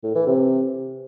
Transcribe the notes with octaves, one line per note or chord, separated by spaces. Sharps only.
A2
E3
C3